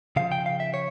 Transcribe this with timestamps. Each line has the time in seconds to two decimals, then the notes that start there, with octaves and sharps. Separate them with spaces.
0.16 C#3 F3 F5
0.32 G5
0.46 F5
0.60 E5
0.74 C#5